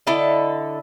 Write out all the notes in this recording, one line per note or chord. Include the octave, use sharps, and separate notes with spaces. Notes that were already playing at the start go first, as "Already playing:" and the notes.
D3 E4 A4 D#5